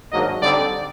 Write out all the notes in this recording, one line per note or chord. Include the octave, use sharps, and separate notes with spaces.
G#2 D#3 F#3 A#3 D4 D#5
D3 G3 C4 D#4 D5